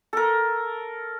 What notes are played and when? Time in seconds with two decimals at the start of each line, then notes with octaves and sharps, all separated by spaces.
0.13 A4 A#4